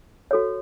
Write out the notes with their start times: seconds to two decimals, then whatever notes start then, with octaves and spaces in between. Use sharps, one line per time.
0.31 F#4 A4 C#5